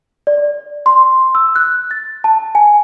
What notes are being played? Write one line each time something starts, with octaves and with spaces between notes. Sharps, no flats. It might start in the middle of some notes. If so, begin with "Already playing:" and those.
D5
C6
E6
F#6
A6
A5
G#5